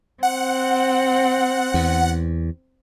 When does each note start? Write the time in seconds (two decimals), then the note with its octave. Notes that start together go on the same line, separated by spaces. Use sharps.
0.23 C4 F#5
1.74 E2